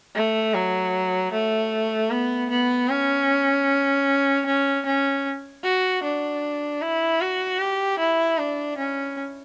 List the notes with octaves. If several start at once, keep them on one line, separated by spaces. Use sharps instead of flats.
A3
F#3
A3
B3
B3
C#4
C#4
C#4
F#4
D4
E4
F#4
G4
E4
D4
C#4